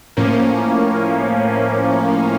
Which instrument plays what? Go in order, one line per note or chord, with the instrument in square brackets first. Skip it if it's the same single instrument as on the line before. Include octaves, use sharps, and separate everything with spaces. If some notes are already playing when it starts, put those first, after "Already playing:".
[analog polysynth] A2 F3 A#3 C#4